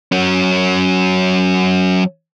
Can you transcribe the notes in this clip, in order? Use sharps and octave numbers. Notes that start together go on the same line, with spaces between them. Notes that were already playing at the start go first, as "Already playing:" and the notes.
F#3 C#4